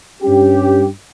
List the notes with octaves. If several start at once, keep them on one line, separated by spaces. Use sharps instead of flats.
G2 G3 C#4 G4